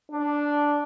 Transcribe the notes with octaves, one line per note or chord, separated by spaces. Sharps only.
D4